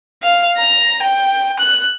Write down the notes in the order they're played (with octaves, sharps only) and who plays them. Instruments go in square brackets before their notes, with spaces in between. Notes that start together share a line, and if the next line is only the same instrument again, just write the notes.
[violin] F5
A#5
G5
F#6